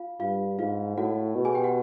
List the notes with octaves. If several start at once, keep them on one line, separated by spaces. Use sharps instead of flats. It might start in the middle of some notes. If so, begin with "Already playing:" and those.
Already playing: F4 F5
G2 F4 F5
G#2 F4 F5
A2 F#4 F#5
B2
G#4 G#5
G4 G5
F#4 F#5